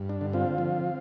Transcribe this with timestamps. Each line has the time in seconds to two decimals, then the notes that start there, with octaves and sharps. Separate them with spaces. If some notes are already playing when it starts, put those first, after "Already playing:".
Already playing: G2
0.09 D4
0.21 D3
0.33 C4 F4
0.58 F3